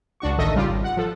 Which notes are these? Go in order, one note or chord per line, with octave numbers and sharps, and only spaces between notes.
C#2 D4 F#4 C#6
A1 D#3 A4 D#5 E5
C#3 G3 F4 G4
G#1
F#5
F3 A4